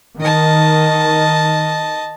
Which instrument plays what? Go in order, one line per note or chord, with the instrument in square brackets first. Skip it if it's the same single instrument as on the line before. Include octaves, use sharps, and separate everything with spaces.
[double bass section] D#3 [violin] D#5 A5